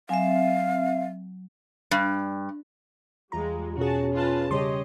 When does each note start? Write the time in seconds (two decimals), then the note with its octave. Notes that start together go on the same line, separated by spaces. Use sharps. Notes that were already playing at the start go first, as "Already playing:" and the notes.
0.09 F#3 C4 E5 F5 G#5
1.91 G2
3.32 E2 G3 G#3 F4 A#5
3.78 B2 C#4 F#4 G#4 A5
4.13 F4 B4 A5
4.51 C#3 G3 G4 C#5 D#5 C6